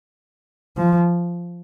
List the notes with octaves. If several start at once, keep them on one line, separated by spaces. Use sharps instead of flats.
F3